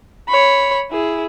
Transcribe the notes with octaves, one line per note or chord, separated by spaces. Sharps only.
C#5 B5
E4 G#4